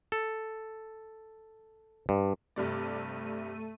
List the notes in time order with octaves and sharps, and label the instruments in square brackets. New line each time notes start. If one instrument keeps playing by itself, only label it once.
[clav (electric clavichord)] A4
G2
[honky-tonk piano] G2 C3 D5 [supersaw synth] A3 D#7